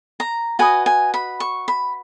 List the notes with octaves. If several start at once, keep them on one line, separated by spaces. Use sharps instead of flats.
A#5
F#4 B4 D#5 G#5
G#5
B5
C#6
B5